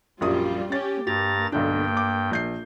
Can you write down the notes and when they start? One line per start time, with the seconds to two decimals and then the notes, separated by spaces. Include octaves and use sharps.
0.21 A#1 F#2 G3 F4 D#6
0.72 C#4 G4 A6
1.07 G2 A#3 G4 A#5 A6
1.52 B1 G2 D3 D4 G5
1.97 D6
2.31 A#1 G6 C7